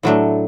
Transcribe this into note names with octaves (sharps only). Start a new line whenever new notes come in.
A2 F#3 A3 D4